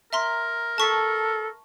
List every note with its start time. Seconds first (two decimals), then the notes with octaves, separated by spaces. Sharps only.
0.13 A#4 E5 A#5 C6
0.78 A4 A5 C#6 B6